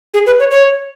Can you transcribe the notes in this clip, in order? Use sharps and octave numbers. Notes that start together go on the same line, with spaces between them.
G#4
B4
C#5
C#5